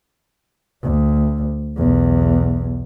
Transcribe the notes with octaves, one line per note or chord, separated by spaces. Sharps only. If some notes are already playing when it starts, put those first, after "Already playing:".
D2
B1 E2